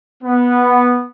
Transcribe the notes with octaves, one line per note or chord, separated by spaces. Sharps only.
B3